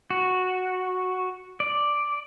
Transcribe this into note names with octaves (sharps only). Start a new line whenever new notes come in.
F#4
D5